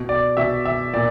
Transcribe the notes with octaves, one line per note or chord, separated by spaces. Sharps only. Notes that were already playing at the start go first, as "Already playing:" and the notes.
Already playing: B2
D5
B2 E5
E5
A#2 D5